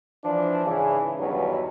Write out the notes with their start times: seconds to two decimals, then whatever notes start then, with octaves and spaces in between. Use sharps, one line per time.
0.24 E3 F3 D4
0.66 G#2 C#3 E3
1.20 E2 G2 B2 D#3 F#3